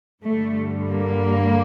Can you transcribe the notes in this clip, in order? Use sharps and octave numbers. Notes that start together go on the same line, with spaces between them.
G2 D3 G3 A3
A#3